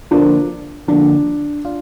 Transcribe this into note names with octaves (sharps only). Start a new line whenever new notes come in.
D3 F3 A#3 D4
D3 F3 A#3 D4
D4 F4